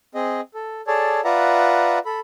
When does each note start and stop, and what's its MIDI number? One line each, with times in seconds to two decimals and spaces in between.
0.15 0.41 60
0.15 0.41 68
0.15 0.41 75
0.54 0.81 69
0.87 1.21 68
0.87 1.21 69
0.87 1.21 73
0.87 1.21 74
0.87 1.21 81
1.24 1.99 65
1.24 1.99 71
1.24 1.99 74
1.24 1.99 76
1.24 1.99 78
1.24 1.99 82
2.05 2.20 69
2.05 2.20 83